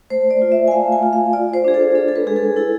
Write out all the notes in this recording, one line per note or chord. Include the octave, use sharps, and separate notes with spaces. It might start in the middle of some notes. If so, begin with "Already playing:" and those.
A3 C5
D5
F4
E5
G#5
A3 F5
G#5
F4
F5
F4 D5
C5
D4 G#4
A4
D4 A4
A4
B4
G#3 G#4
A4
E4 A4